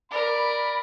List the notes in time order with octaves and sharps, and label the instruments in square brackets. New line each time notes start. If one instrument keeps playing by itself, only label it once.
[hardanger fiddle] A#4 [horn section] D5 B5